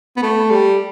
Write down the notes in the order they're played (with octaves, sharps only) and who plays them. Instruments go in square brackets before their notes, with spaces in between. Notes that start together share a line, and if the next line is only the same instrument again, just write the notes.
[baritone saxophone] B3
A3
G3